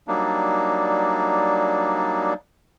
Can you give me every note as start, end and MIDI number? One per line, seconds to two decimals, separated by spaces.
0.08 2.34 54
0.08 2.34 55
0.08 2.34 58
0.08 2.34 62
0.08 2.34 63